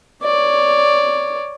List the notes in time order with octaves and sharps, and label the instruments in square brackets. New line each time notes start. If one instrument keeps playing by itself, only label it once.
[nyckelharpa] C#5 D5